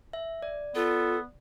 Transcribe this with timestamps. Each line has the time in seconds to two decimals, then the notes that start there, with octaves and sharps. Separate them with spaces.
0.13 E5
0.42 D5
0.75 B3 F4 A4